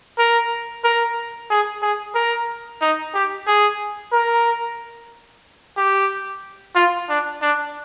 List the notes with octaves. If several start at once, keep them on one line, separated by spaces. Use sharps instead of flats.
A#4
A#4
G#4
G#4
A#4
D#4
G4
G#4
A#4
G4
F4
D4
D4